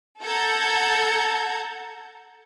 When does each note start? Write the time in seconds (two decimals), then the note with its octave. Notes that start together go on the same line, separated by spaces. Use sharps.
0.23 A4 F#5 A5 A#5 G6 G#6